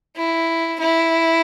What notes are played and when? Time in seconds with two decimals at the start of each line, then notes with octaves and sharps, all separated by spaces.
0.17 E4
0.80 E4